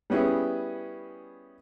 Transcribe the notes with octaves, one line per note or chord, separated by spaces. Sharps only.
G3 B3 C#4 E4 G#4